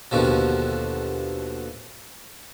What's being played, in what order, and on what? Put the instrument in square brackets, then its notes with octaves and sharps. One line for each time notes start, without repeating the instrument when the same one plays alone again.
[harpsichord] D#2 B2 D3 F3